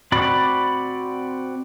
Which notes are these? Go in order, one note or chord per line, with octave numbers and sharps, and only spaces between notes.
C4 F#4 D5 B5